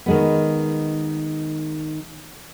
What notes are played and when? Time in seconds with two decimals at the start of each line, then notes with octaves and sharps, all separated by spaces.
0.06 D#3 G#3 B3